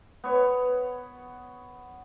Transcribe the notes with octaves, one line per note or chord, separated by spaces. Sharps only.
B3 C#5